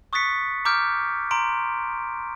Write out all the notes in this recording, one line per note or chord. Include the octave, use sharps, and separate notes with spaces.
C#6 D#6 F#6 A6 B6 C#7
A#5 D6 F6 G6 D7
A#5 C6 D7